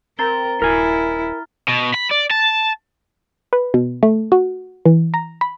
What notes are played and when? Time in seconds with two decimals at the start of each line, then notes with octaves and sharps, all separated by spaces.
0.19 C4 A#4 A#5 A6 G7
0.62 D#1 E4 A#4 G#5 F6
1.69 B2
1.95 B5
2.11 D5
2.31 A5
3.53 B4
3.74 B2
4.03 A3
4.32 F#4
4.86 E3
5.14 A#5
5.41 B5